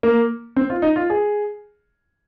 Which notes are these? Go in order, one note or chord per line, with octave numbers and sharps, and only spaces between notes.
A#3
C4
F4
D#4
F4
G#4